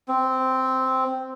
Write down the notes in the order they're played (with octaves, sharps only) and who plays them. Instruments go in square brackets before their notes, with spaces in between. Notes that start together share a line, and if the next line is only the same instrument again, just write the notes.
[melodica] C4